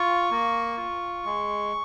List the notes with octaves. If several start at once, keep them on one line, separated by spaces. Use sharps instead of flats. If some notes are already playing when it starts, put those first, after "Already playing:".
Already playing: F4 C#6
A#3
F4
G#3